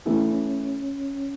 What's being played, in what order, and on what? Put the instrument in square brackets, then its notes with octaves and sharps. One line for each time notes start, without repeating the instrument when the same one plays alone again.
[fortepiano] C#3 E3 A3 [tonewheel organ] C#4
[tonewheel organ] D4
C#4